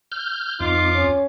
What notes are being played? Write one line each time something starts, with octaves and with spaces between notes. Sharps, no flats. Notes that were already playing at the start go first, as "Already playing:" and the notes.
F6 G6
F2 D#4 F4 D6
C#4